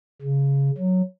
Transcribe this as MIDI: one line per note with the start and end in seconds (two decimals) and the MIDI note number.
0.22 0.71 49
0.78 1.02 54